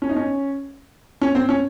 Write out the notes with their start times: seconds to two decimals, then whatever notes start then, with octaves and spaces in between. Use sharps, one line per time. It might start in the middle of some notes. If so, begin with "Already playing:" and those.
0.02 C#4
0.09 D#4
0.16 C#4
1.21 C#4
1.35 C4
1.49 C#4